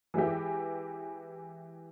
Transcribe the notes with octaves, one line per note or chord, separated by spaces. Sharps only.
E3 G#3 E4 G4